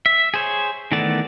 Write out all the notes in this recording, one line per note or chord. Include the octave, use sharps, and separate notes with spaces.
E5
G#4 C5 C#5
D#3 E3 A3 B3 D5